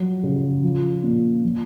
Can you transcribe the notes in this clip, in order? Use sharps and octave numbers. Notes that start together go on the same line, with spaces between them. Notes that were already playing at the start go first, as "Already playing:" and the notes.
Already playing: F3 F#3
C#3
F3
A#2
F3